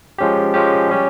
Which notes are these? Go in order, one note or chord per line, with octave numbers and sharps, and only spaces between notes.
F3 G#3 C#4 G4
F3 G#3 C#4 G4
G3 C#4 G4